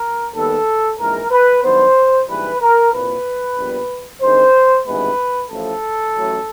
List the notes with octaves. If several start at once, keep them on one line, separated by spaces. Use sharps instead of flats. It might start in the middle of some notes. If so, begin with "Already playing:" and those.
Already playing: A#4
D#2 D#3 G3 B3 A4
A#1 G#2 E3 G#3 A#4
B4
G2 D#3 F#3 B3 C5
A#1 G#2 E3 G3 B4
A#4
C2 A#2 F3 A#3 B4
A#1 A#2 G3 B3
G2 D#3 G#3 C4 C5
G#1 G2 E3 G#3 B3 B4
A1 A2 F3 A4
A1 A2 F#3